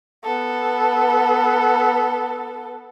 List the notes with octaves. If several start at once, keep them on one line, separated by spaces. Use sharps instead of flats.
B3 A4